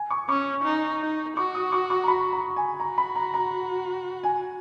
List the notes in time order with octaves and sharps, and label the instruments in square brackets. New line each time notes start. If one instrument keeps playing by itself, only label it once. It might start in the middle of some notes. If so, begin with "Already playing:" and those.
Already playing: [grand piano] G#5
C#6
[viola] C#4 [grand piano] C#6
[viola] D#4
D#4
[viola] F#4 [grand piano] C#6
[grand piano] D#6
C#6
C#6
A#5
B5
A#5
G#5
[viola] F#4 [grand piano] A#5
[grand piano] B5
A#5
A#5
G#5